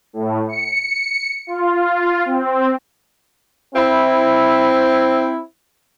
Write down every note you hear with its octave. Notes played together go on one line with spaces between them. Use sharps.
A2
C#7
F4
C4
C4 E4